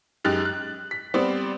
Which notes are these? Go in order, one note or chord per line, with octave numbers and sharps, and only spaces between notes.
F#2 G#3 D#4 G4 F#6 A6
F#6
B6
G3 B3 C4 C5 D5